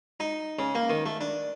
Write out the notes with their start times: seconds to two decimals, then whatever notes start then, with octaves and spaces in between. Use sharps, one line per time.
0.20 D#4
0.59 C#3
0.75 A#3
0.90 D#3
1.06 A3
1.21 D4